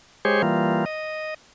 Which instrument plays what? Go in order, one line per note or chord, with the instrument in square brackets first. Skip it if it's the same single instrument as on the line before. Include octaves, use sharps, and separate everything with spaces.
[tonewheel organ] G#3 G4 G#4 C5 C#5
E3 G3 A#3 F4
D#5